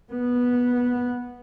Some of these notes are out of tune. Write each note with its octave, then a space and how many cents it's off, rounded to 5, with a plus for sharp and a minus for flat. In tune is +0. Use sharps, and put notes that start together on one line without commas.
B3 -10